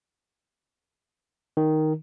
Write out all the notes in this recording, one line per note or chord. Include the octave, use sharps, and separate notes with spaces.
D#3